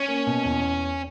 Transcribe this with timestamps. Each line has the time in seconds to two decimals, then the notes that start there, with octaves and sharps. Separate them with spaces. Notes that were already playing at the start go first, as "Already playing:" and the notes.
Already playing: C#4
0.08 A#3
0.27 B2
0.45 E2